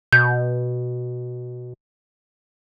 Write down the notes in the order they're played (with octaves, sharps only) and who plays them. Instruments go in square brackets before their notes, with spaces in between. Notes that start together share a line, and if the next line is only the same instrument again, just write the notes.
[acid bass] B2 [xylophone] G6